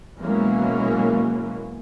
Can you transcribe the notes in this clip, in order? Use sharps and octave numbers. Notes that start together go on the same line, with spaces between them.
B2 E3 F#3 G#3 A#3 C#4